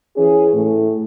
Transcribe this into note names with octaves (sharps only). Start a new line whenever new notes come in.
E3 C#4 G#4
A2